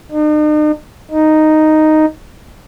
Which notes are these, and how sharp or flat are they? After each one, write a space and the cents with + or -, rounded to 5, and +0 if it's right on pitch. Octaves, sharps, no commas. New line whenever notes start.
D#4 -45
D#4 -5